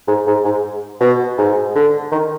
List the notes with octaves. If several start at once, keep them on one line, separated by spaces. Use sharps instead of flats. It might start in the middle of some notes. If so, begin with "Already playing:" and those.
G#2
G#2
G#2
B2
G#2
D3
D#3